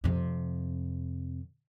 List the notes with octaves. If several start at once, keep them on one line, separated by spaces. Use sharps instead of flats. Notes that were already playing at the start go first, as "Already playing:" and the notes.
F2 C3